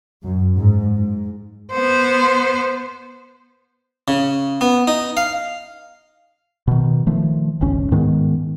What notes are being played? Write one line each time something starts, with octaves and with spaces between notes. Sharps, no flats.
F#2
G#2
G#2
B3 C5
C#3
B3
D#4
F5
B2 D#3
D#3 F3 A3
G1 C#2 C#4
G#2 D#3 G#3 B3